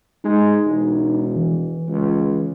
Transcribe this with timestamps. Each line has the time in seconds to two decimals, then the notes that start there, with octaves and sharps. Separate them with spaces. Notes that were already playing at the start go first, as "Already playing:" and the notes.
0.24 G#3 D#4
0.64 E1
1.36 E3
1.88 C#2